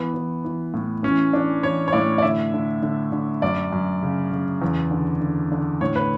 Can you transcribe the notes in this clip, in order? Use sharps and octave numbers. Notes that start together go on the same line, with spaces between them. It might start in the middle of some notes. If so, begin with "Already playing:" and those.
Already playing: E3 B3
E3
E3
A2
E3 C#4
E3 D4
E3 C#5
C#5
A2 D5
D5
D3 E5
D3
D3
D3
F#2 D5
F#2
C#3
C#3
E2
D3
D3
D3
A2 C#5
B4